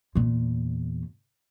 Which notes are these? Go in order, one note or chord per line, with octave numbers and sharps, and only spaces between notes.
E2 A#2